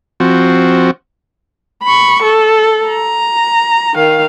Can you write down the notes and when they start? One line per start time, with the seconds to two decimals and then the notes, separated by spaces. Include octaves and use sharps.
0.20 F3 C4 F#4
1.83 B5 C#6
2.23 A4
2.87 A#5
3.94 D#3 F5